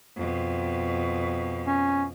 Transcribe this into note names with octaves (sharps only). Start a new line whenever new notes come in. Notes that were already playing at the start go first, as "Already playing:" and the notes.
F2 B2
C#4